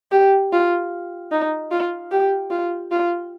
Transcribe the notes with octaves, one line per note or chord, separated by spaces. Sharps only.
G4
F4
D#4
F4
G4
F4
F4